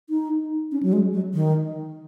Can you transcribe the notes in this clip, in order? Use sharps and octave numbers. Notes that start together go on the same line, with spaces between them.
D#4
C#4
F#3
G#3
F#3
D#3